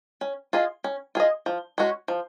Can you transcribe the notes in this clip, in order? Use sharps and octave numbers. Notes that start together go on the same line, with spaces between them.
C#4
F4 G#4 D#5
C#4
F4 G#4 D#5
F3
G#3 C#4 F#4
F3